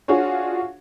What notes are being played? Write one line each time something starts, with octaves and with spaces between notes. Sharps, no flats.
D4 F4 F#4 G#4 C#5